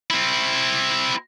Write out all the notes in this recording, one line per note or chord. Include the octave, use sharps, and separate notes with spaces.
C4 E4